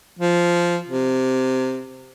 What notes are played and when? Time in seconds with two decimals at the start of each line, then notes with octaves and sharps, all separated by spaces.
0.19 F3
0.89 C3